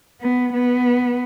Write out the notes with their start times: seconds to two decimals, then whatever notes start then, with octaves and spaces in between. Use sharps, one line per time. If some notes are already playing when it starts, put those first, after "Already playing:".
0.21 B3
0.53 B3